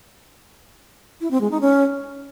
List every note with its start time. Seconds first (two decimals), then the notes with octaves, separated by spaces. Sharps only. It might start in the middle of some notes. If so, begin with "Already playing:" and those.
1.21 E4
1.31 C4
1.41 G#3
1.51 D#4
1.61 C#4